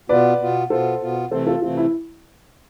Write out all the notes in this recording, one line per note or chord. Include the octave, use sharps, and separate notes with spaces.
B2 B3 F4 B4 D5
B2 B3 F4
B2 B3 F4 A4 C5
B2 B3 F4
C3 E3 A3 C4 A4 C5
F4 A4
C3 E3 A3 C4 F4
E4